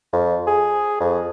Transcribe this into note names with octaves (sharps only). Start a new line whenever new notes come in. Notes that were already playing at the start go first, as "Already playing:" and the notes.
F2
G#4
F2